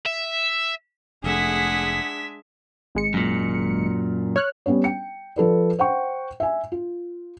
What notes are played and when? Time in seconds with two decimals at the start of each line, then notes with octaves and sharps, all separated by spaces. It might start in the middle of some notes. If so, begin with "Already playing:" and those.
0.06 E5
1.24 F1 G#3 A3 D4 G#4 E5 F#5 B6
2.95 G#1 G#3 C#7
3.14 F#2 A#2
4.36 C#5 F6 F#6
4.66 G3 B3 C#4 C#5
4.84 G5 C#7
5.36 F3 A4 B4 D5
5.79 C5 F#5 G5 C#6
6.40 E5 G#5
6.72 F4